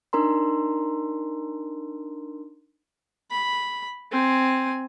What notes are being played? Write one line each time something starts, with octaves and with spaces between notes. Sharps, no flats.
D4 D#4 A#4 A#5 C6
B5
C4 G#5